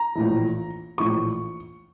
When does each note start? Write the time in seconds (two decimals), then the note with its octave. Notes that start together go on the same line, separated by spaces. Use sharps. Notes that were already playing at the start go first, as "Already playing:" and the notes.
Already playing: A#5
0.15 A#1 A2 E3
0.98 A#1 A2 E3 C#6